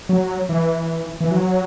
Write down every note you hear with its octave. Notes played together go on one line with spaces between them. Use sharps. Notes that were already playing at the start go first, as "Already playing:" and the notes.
F#3
E3
E3
F#3